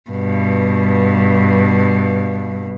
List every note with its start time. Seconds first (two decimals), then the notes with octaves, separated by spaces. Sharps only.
0.10 G2 B2